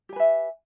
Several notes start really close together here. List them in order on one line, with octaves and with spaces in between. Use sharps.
G4 G#5 B4 E5